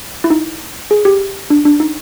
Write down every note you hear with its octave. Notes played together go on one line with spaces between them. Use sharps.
E4
D#4
G#4
G4
D4
D4
D#4